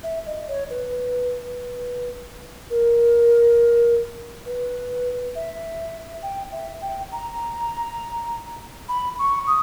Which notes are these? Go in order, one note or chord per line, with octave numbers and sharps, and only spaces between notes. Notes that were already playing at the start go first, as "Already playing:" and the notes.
E5
D#5
C#5
B4
A#4
B4
E5
G5
E5
G5
A#5
B5
C#6
D#6